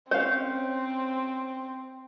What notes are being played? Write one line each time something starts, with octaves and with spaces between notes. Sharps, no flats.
C4 C#4 C5 C#5 F5